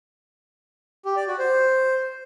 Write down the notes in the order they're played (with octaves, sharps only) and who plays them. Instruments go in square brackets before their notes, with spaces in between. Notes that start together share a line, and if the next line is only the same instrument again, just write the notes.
[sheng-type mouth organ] G4
D5
F#4
C5